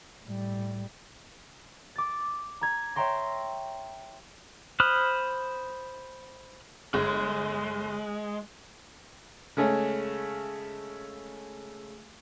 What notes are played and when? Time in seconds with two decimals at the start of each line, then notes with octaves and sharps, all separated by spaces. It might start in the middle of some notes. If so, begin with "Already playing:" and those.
0.24 A2 G3
1.96 D6 A6
2.61 A#5 G#6
2.95 C#5 E5 G5 A#5 C6 A#6
4.80 C5 B5 D#6 F6 F#6
6.94 G1 G#3
9.57 C#3 G#3 A3 C#4